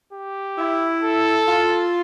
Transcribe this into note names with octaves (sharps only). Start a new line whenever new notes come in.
G4
E4
A4
F4